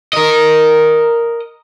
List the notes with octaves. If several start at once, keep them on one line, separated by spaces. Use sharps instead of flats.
A#4 D#5